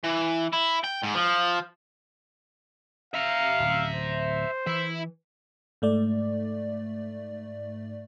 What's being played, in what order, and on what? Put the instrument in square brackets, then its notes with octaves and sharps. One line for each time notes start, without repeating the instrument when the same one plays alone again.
[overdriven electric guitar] E3
E4
G5
G#2
F3
[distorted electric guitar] E5 A#5 [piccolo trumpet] F5
[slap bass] D1
[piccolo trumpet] C5
[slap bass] E3 [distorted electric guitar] E4 E5
[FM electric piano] G#2 A3 D5